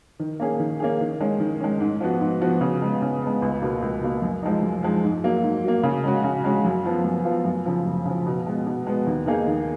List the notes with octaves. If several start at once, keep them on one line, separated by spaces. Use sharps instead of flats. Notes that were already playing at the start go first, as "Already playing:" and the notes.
D#3
A#3 C#4 G#4
D#3
A#3 C#4 G#4
D#3
G#3 C#4
D#3
G#3 C#4
G#2
F3 B3 F#4
G#2
F3 B3 F#4
C#3
G#3 B3
C#3
G#3 B3
C#2
B2 A#3
C#2
B2 A#3
F#2
F3 G#3 D#4
F#2
F3 G#3 D#4
G#2
F#3 A#3
G#2
F#3 A#3
C#3
G#3 C#4 F#4
C#3
G#3 C#4 F#4
F#2
F3 B3 F4
F#2
F3 B3 F4
F#2
C#3 F3
F#2
C#3 F3
B2
G#3 B3
B2
G#3 B3
D#2
D#3 A#3 D#4 G#4
D#2